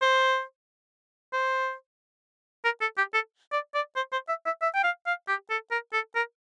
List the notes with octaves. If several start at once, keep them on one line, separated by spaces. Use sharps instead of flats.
C5
C5
A#4
A4
G4
A4
D5
D5
C5
C5
E5
E5
E5
G5
F5
F5
G4
A4
A#4
A4
A#4